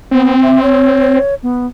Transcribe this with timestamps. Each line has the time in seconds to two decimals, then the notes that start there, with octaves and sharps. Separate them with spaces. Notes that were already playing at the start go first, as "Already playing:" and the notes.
0.11 B3 C4
0.43 E5
0.62 C#5
1.43 B3